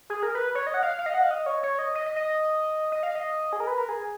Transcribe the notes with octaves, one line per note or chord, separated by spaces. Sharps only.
G#4
A#4
B4
C#5
D#5
F#5
F5
F5
D#5
F#5
F5
D#5
C#5
C#5
D#5
D#5
D#5
D#5
D#5
F5
D#5
G#4
A#4
B4
A#4
G#4